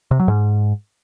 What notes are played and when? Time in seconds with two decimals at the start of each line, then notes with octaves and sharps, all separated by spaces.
0.11 C3
0.20 F#3
0.28 G#2